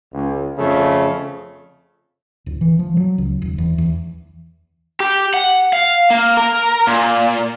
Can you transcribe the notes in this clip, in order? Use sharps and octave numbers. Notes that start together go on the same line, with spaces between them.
C#2
F2 C#3 A3
D1
E3
F3
F#3
C#2
D#1
E2
E2
G4
F#5
F5
A#3
A#4
A#2